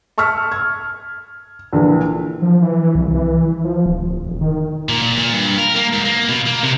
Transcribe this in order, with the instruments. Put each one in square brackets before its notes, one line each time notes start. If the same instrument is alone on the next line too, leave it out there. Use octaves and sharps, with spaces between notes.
[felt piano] A5 C#6 E6 F6 B6
G#6
A#1 D3 E3
[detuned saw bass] F3
E3
C2
E3
F3
D1
E1
D#3
[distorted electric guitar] A#2
A#2
A#2
G2
A#4
A#3
G#2
A#3
B2
A#3
C3